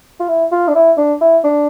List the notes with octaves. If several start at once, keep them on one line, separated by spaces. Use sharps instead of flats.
F4
E4
F4
D4
E4
D4
E4
D4